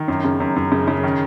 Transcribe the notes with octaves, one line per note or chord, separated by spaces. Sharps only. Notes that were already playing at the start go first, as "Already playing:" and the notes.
Already playing: D#3
F#2
C#3
F#2
F#2
C#3
C#3
D#3